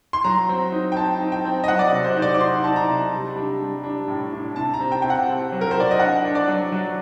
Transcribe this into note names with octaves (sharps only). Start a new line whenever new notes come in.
C6
F#3 A#5
C4
D#4
G5
C4 A5
D#4
G5
C4
D#5
F#3 F#5
D5
D#5
C3
C5
D#4 C5
D5
D6
D#4 C6
D#4 A5
A#5
C3
G3
D4
G3
D4
A2
D4
C3 A5
A#5
C4
G5
C3 G5
F#5
C4
F#3
A#4
C5
C4 D5
D#5
D4 F#5
D4
D5
F#3
F#3